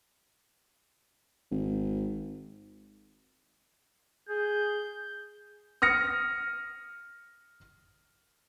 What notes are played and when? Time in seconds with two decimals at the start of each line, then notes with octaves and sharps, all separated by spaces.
1.51 G#1
4.29 G#4 G6
5.82 D#6 F6 A#6 C#7